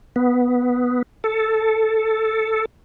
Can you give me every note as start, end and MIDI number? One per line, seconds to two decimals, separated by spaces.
0.16 1.02 59
1.24 2.65 69